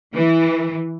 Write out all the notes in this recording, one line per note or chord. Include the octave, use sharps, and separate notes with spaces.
E3